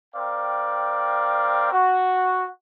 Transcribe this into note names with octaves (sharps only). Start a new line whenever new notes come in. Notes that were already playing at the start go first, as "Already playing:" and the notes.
C4 A#4 D5 F5 G5
F#4